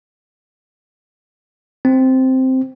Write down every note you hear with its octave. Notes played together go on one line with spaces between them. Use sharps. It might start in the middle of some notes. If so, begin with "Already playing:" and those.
C4